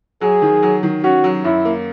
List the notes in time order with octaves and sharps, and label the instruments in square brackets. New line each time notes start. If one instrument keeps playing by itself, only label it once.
[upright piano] F#3 [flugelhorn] G#4
[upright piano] D#3
F#3
D#3
[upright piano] C#4 [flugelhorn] F#4
[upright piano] F#3
[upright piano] F#2 [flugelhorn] E4
[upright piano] A#3